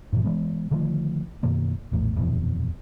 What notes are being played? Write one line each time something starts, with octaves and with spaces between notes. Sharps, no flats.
G2 A#2 E3
E3 G#3 B3
D3 D#3 F3 A3
F#2 B2 D#3 A#3
A#1 E2 A2
D#1 F2 B2 E3